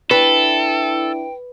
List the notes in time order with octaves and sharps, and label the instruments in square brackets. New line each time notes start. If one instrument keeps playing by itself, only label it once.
[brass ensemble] D4 E4 [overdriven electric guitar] A4 [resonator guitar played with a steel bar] B4 [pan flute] G5